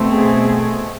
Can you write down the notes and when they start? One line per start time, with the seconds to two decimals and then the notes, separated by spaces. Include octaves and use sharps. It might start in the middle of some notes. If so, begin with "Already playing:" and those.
Already playing: B2 A3 C4
0.10 G#4